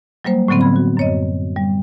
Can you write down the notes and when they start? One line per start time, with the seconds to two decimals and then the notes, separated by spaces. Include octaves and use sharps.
0.24 F#3 G3 A#3 C5
0.48 A2 D3 F#3 B3 C4
0.60 A2 B5 G#6
0.76 F#4
0.97 F#2 C#5 D#5
1.56 G3